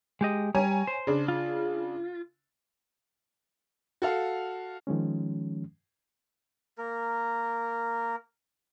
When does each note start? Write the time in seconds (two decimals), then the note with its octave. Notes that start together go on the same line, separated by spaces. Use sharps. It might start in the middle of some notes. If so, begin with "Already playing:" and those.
0.21 G#3 G4 D#5
0.55 G3 C#5 G#5 A#5
0.87 C5
1.07 C#3 D4
1.28 F4
4.02 F#4 A4 F5
4.87 D#3 F3 G#3 C#4
6.78 A#3 A#4